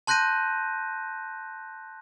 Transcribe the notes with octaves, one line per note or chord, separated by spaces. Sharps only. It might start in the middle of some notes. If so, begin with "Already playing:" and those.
A5 C6 F#6 G6 A#6 D#7